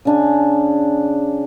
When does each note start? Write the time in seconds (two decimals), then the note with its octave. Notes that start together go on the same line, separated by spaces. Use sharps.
0.05 C#3 D4 G#5